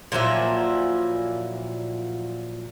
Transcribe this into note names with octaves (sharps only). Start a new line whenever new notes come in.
A#2 F3 F#3 E4